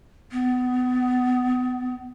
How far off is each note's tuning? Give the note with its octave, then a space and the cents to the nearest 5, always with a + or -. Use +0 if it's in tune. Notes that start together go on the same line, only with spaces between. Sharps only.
B3 +25